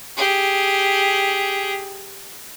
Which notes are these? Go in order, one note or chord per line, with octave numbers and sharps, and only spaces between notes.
G4 G#4